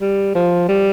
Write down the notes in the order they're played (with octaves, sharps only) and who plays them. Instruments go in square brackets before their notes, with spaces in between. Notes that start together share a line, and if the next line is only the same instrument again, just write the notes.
[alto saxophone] G3
F3
G3